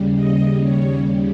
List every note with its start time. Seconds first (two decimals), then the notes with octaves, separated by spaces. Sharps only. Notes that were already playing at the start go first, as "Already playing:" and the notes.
Already playing: D#2 C#3 G3
0.15 D#5
0.62 C#5